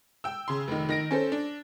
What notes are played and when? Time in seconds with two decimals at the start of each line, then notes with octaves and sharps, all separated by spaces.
0.24 G5 E6
0.48 C#3 C6
0.68 F1 D#3
0.89 D#3 A#6 D7
1.11 C#4 A4 C5
1.32 D4